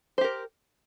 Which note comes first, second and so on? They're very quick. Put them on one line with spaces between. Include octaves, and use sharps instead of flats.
C5 G4 A#4